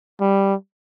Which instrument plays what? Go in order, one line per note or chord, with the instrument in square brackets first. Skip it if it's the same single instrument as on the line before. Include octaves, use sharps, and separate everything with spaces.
[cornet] G3